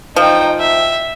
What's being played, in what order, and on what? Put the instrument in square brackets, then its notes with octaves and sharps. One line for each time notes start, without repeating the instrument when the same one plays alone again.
[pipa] F3 [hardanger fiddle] D#4 G5
[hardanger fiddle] E5